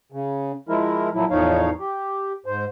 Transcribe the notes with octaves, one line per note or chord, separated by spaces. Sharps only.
C#3
F3 G#3 E4 A#4
A#2 F3 F#3 E4
E2 A2 F3 D#4 C#5 F5
G4
G#2 C5